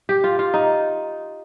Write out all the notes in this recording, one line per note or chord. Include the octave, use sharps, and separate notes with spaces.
G4
F4
F4
D#4